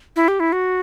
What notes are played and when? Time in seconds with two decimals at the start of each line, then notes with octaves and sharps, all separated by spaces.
0.16 E4
0.28 G4
0.40 E4
0.52 F#4